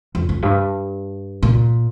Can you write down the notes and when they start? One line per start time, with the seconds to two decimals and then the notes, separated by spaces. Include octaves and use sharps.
0.15 F2
0.29 F2
0.43 G2
1.43 A#2